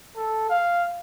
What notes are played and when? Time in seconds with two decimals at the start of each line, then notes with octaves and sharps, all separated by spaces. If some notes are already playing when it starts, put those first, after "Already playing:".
0.16 A4
0.50 F5